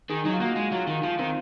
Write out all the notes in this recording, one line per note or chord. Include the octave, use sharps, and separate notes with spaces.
D#3 G#4
F#3 D#4
F4
A#3 F#4
G#3
F#3 F4
D#3
F3 F4
D#3 C4